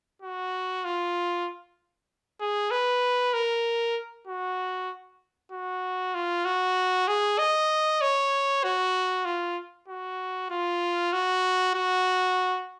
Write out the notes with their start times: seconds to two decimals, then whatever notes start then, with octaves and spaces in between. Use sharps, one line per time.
0.22 F#4
0.85 F4
2.41 G#4
2.71 B4
3.34 A#4
4.28 F#4
5.52 F#4
6.15 F4
6.45 F#4
7.08 G#4
7.39 D#5
8.01 C#5
8.64 F#4
9.25 F4
9.88 F#4
10.51 F4
11.13 F#4
11.74 F#4